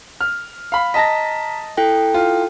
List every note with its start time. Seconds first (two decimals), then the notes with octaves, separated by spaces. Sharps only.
0.21 F6
0.72 F5 B5
0.94 D#5 A5 A#5 A#6 B6
1.77 E4 A4 G5
2.14 F4